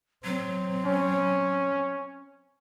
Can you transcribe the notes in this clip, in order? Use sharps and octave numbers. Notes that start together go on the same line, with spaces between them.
F#3 C4
C#4